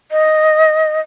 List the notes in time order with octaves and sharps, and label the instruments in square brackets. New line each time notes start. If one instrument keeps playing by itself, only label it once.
[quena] D#5